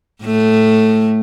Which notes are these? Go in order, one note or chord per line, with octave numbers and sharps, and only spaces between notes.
A2 A3